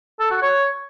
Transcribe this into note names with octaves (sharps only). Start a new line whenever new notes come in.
A4
F#4
C#5